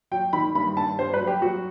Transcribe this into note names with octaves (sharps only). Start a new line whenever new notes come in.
F#3 G5
D#3 B5
G2 B5
G2 A5
G2 C5
B4
F#3
G4
F#3 F#4